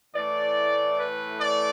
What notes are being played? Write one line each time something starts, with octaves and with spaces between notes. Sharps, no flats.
A2 E3 A3 D5
B4
D5